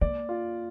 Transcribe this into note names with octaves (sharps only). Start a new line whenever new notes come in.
A#3 D5
F4